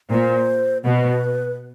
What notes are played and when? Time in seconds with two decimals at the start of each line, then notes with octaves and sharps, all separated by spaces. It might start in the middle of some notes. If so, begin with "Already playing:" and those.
0.10 A#2 C5
0.85 B2 B4